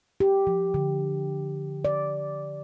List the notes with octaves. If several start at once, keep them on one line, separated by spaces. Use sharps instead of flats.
G4
F3
D3
D5